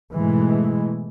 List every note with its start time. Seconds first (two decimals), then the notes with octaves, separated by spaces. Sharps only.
0.14 G#2 B2 E3 G#3 A3